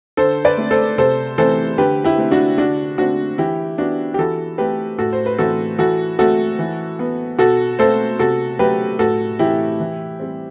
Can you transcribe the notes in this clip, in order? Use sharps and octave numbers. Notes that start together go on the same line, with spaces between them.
D3 A4 C5
B4 D5
A3 C4
A4 C5
C3 A4 C5
E3 A3 C4 A4 C5
D3 G4 B4
E4 G4
A3 C4
D4 F#4
D3 D4 F#4
A3 C4 D4 F#4
E3 E4 G4
B3 D4 F#4
G4
E3 F#4 A4
A3 C4 G4 B4
A2 F#4 A4
C5
B4
E3 A3 C4 F#4 A4
E3 F#4 A4
A3 C4 F#4 A4
E3
B3
B2 F#4 A4
A3 C4 A4 C5
C3 F#4 A4
F#3 A3 G4 B4
A2 F#4 A4
E3 A3 C4 E4 G4
E3
G3 C4